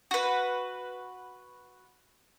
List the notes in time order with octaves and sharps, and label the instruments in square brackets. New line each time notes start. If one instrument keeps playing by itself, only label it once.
[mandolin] F#4 B4